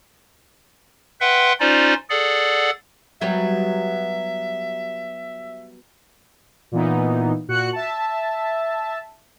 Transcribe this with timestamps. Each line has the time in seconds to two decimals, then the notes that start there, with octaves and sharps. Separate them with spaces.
1.21 B4 E5 F#5 G5 C6
1.60 C#4 D#4 F4 C5 D5
2.10 G#4 A4 D5 F#5
3.21 F#3 G3 B3 E5
6.72 A#2 E3 B3 D#4
7.48 A#2 F#4 F#6 C#7
7.73 E5 A5